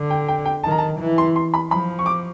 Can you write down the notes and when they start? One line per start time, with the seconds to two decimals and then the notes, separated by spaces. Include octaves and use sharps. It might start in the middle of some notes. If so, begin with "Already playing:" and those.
Already playing: D3
0.10 G5
0.28 G5
0.45 G5
0.64 D#3 A5
0.71 A#5
0.78 A5
1.00 E3
1.18 C6
1.36 C6
1.54 B5
1.71 F3 B5
1.99 C#6
2.06 D6